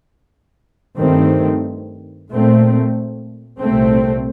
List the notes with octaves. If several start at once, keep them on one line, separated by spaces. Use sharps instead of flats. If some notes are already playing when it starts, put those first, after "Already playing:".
G2 D#3 A3 C4
A#2 A3 C4
C2 A#2 A3 C4